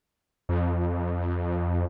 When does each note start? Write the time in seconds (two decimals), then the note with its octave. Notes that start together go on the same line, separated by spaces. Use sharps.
0.49 F2